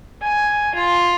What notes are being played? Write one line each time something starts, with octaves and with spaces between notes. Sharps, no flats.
G#5
F4